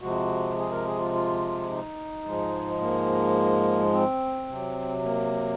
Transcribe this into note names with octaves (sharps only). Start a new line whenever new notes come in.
C3 F3 G#3 F#4
G#4
A#4
G#4
F4
F4
D#4
G#2 F3 G#3
A#3
C4
C3 F#3
A#3